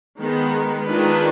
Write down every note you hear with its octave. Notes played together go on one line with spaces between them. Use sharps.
D#3 G#3 B3
D#3 G#3 D4 F4 B4